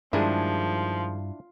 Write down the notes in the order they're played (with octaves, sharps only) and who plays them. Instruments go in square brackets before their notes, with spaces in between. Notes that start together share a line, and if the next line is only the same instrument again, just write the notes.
[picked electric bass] G2 [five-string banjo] D#3 G#3 G#4 [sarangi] F3 [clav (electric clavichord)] D4 E4